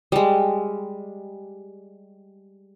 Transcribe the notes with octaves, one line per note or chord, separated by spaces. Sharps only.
G3 G#3